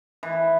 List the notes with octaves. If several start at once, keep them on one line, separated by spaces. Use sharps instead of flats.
E3